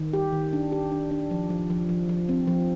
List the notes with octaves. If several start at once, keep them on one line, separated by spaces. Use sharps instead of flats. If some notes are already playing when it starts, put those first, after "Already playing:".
Already playing: D#3
G4
D#3
D4
G4
D4
D4
F3
F3
F3
F3
F3
C4
F3